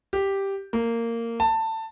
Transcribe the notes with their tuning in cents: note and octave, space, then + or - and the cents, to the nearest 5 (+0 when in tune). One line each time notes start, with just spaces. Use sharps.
G4 +0
A#3 -15
A5 +20